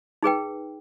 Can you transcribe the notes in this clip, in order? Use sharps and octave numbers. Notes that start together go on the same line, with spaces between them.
D#4 G#4 B4 G5